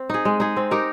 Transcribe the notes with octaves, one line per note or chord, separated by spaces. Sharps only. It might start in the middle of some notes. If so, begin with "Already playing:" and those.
Already playing: C4
D#4 G#4
G#3
D#4 G#4
C4
D#4 G4 A#4